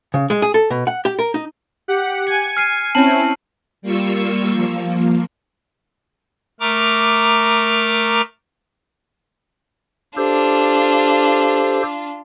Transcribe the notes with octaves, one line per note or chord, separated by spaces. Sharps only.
C#3
G#3
G#4
A4
B2
F#5
G4
A#4
D#4
G4 F#5
G#5 G#6 C#7
F6 C7 D#7
C4 C#4 E4 A5 C7 F#7
G3 A#3 F4 C#6 E6
F3 A#3
A3 A#4 A#5 D6
D4 F4 G4 A4 C5